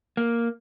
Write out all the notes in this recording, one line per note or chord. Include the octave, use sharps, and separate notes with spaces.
A#3